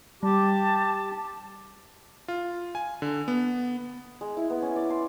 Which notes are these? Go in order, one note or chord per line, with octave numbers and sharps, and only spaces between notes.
G3 G4 A5
F4
G#5
D3
B3
G#3
E4
B3
C#4
D5
C6